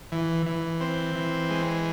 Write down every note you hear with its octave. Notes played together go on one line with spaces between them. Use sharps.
E3
E3
C4
E3
G#3